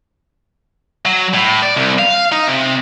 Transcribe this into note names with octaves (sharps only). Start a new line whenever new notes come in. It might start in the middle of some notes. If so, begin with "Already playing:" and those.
F#3
A2
D5
C2
F5
D#4
C3